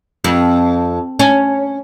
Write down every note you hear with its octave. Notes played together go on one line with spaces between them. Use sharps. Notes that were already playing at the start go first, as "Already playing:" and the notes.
F2
C#4